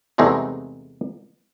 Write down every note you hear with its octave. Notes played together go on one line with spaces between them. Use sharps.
E2 C3 G#3 A3 C4 D#4